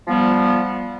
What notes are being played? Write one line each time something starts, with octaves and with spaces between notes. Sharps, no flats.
F3 G3 B3